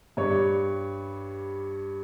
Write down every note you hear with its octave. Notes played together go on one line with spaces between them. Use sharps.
G2 G3 C#5